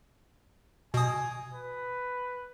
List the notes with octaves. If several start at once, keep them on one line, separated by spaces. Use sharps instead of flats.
B2 G#5 D#6
B4